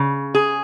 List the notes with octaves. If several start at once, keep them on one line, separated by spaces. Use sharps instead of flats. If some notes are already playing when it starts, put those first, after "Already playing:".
Already playing: C#3
G#4